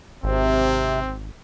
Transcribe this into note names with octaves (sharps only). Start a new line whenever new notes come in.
G#1 C3 C4